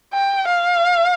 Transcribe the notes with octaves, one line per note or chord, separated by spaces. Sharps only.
G5
F5